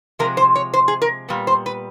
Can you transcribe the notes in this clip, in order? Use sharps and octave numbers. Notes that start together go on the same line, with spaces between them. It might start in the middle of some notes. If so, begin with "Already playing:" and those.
C3 F3 G#3 A#4
C5
C#5
C5
G#4
A#4
A#2 G3 B3
C5
B4